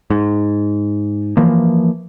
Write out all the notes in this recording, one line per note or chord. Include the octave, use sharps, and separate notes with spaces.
G#2
E3 F3 A#3